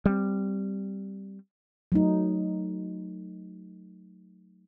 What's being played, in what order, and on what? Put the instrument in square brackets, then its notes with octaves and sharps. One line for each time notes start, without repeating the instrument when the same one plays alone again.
[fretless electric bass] G3 C4
[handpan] F#3 A3 D#4